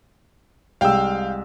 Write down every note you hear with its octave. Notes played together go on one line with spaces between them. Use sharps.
C2 G#3 F5 G5 E6